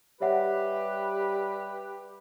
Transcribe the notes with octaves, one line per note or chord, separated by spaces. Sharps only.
G3 G4 B4 C#5 E5 F#5